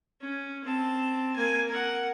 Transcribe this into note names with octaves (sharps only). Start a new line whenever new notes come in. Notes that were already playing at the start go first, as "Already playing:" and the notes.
C#4
C4 A5
A#3 G#5
A#4 F#5